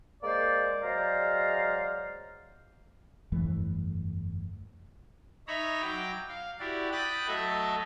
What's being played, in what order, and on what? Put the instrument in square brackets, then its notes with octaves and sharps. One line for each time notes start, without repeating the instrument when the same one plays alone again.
[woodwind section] G#3 A#3 C5 D5
F#3 G#3 C5 D5 F5 A#5
[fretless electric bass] G1 F2 E3 A3
[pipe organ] D#4 C#5 E5 A#5 B5
F#3 G5 D6
F5
E4 F#4 G4 D5
G5 B5 D#6 F#6 A6
F#3 A3 A4 D#5 E5 A5